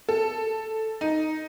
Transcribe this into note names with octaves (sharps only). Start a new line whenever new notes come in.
A4
D#4